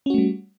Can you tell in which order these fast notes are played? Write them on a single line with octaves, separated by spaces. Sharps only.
C#4 F#4 A3 G3